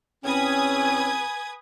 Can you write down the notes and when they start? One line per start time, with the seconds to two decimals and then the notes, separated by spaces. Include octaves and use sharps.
0.25 E2 C4 C#4 B4 G#5 D#6 G#6